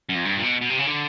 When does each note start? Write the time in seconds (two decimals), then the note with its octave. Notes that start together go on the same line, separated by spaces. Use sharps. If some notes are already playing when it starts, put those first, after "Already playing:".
0.09 F#2
0.15 F2
0.25 G2
0.37 A#2
0.43 B2
0.61 B2
0.70 C3
0.78 C#3
0.86 D3